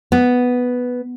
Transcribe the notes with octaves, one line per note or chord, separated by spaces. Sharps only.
B3